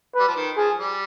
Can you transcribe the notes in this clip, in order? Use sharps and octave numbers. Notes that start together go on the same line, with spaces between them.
G3 B4
F3
D#3
F3 G#4
G3